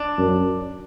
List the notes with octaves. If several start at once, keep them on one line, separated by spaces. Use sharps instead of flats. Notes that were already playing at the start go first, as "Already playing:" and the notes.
Already playing: D4
F#2